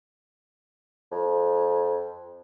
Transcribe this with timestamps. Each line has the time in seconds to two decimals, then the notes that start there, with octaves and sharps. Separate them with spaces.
1.12 F2